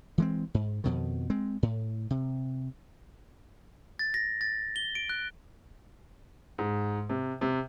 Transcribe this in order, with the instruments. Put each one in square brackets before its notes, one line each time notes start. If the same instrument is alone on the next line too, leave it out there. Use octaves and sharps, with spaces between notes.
[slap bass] E3 G#3 C4
G#2
F2 B2 D#3
G#3 C4
A2
C3
[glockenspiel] A6
A#6
A6
G7
D7
F#6
[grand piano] G#2
C3
C3